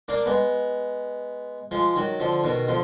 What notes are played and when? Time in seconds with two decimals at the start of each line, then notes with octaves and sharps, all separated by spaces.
0.08 A#3 D4
0.26 G#3 B3
1.71 F3 G#3
1.96 D#3 F#3
2.20 D3 F3
2.44 B2 D#3
2.68 D3 F3